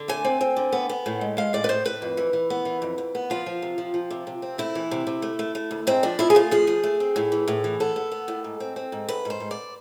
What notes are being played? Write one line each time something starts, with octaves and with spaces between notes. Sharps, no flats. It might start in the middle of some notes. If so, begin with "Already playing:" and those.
Already playing: D3
A3 G#5
C4
C4
D3
B3
B3
A2
G#3
G#3 F5
A2 D5
B4
A2 C5
A2 B4
F2
E3
E3
B3
E3
F2
F2
B3
F3 F4
F3
C3
F3
F3
C3
C3
C4
A3 E4
E3
C3
C3
A3
A3
A3
D2
G#2 C4
F3 D4
F3 E4
G#4
A3 F4
F3 G#4
F3
A3
C4
A2
E3
A2
E3
B3 A4
B3
B3
A2
G#2
C4
C4
G#2
G#2 B4
G#2 C5
G#2
D5